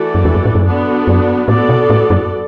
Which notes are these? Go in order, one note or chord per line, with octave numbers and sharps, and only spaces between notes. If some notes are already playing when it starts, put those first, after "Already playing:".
Already playing: E3 A3 F#4 A4 D5
F#2
E2
F#2
A2
F#2
D3 B3 D4 F#4
F#2
A2 B3 F#4 A4 D5
B2
A2
F#2